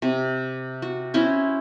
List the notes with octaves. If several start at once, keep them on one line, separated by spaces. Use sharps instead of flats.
C3
F#4
C#4 E4 C5